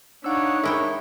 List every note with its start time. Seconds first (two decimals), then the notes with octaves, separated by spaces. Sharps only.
0.24 D4 D#4 C#5 F5 F#5 E6
0.64 G#3 E4 A#4 E5 G5